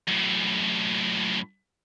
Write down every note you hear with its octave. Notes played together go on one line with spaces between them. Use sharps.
F#2 A2